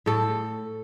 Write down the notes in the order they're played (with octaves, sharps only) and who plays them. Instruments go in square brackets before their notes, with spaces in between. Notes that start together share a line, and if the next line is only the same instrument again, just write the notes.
[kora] A2 A4